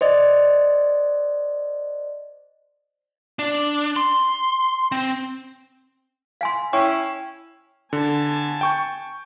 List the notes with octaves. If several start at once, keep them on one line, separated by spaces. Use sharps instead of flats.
C5 D5 D#5
D4
C6
C4
F5 G#5 C6
C#4 E4 C#5 G5 C#6
D3 G#5 A5
G5 C#6 G6